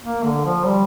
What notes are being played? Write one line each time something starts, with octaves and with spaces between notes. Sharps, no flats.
A#3
D3
F3
G3